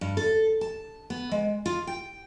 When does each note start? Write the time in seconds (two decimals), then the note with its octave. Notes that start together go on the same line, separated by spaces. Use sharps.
0.01 G2
0.17 A4
0.61 A5
1.10 B3
1.32 G#3
1.66 F4
1.87 G5